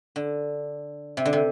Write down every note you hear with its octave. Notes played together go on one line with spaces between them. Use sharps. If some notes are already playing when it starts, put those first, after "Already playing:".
D3
C3
D3
C3